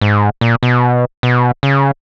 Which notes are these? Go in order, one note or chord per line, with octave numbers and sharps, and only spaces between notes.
G#2
A#2
B2
B2
C#3